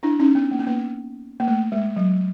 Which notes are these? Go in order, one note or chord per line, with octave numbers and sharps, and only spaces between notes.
D4 E4
C#4 D#4
B3
A#3
B3
A#3
A#3
A3
G#3
F#3